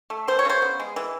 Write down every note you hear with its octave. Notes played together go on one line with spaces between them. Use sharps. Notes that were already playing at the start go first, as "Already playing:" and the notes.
A3
E3 C5
C#5
C#3 C5
B3
G#3
E3